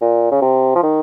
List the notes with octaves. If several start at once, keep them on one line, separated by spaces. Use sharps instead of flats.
A#2
C#3
C3
F3
D#3